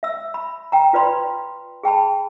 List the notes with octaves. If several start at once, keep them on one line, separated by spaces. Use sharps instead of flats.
E5 E6
B5
G5 A#5
F4 B4 D5 B5 C6
G#4 G5 A5 B5